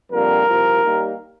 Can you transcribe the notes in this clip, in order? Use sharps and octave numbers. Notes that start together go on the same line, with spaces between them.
F2 D3 G3 A#3 A#4
C2 C3 F3
D#2 D#3 G3 A#3